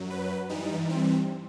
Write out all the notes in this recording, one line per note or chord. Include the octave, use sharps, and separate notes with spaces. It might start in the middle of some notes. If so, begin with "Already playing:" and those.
Already playing: F#2 F#3
B4
G2 E3 G3 D#4
C4